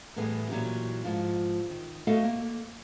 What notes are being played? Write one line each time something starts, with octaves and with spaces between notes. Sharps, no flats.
A2 E3 G3 B3 G#4
A#2 E3 F#3 C#4 G4
G#2 F3 F4
D#3
A3 B3 F#4 A4 D#5 F5
A#3